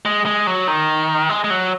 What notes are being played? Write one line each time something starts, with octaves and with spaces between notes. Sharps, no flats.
G#3
G#3
F#3
D#3
G#3
G#3
F#3